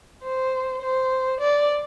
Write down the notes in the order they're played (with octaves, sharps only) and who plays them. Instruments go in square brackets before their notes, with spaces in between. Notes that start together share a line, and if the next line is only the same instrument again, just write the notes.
[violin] C5
C5
D5